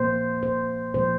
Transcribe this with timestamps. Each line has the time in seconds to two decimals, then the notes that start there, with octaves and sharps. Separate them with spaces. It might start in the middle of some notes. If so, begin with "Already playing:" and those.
Already playing: A#2 F3 A#3 C5
0.43 C5
0.94 A#2 F3 A3 C5